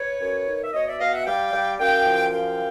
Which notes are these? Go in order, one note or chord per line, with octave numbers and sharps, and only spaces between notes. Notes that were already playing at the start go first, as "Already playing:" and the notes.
Already playing: B4 C#5
F#2
D#3
E5
B2 C#5 D#5
D5 E5
B2 D#5 F5
E5 F#5
G3 F5 G5
G3
F#2 F5 G5
F3
F#2 F5 G5